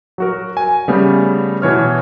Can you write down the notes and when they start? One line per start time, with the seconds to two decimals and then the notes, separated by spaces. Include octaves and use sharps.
0.18 F#3 F#4 A#4
0.57 G#5
0.88 C#3 G3 A3 B3
1.62 B2 E3 C#5 F6